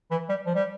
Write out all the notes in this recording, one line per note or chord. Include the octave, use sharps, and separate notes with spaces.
E3
G3
F3
G3